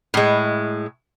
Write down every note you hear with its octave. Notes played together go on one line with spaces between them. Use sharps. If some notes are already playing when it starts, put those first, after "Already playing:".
A2 G#3